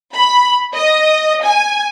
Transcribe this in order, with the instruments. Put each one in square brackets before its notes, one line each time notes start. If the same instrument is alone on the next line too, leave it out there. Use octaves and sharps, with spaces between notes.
[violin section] B5
D#5
G#5